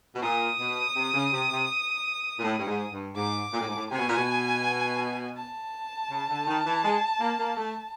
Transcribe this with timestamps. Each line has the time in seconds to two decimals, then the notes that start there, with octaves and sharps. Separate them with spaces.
0.15 B2
0.23 A#2 D#6
0.59 B2
0.96 C3
1.14 C#3
1.32 C3
1.51 C3
2.39 A#2
2.44 A2
2.58 G2
2.67 G#2
2.93 G2
3.16 G#2 D6
3.53 A#2
3.60 A2
3.68 G#2
3.75 A2
3.91 C3 G#5
3.98 B2
4.08 A#2
4.17 B2
5.37 A5
6.10 C#3
6.30 D3
6.47 D#3
6.66 E3
6.84 G#3
7.21 A#3
7.40 A#3
7.57 A3